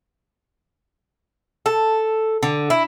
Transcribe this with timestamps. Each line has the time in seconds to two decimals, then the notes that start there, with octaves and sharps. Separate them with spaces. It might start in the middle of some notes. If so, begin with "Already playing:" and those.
1.66 A4
2.43 D3
2.70 E4